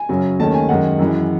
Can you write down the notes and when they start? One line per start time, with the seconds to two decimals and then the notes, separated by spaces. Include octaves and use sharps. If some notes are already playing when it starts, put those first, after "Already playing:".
Already playing: G#5
0.09 F#2 C#3 F#3 C#4
0.39 D#2 D#3 A3 C#4 A5
0.54 G#5
0.69 F#2 D#3 G#3 F#5
0.99 F#2 E3 G#3